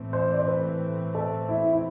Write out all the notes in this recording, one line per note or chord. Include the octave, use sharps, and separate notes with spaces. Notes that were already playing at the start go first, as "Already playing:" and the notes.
Already playing: A2 E3 A3 C4
C5
D5
C5
B4
A4
E4
E4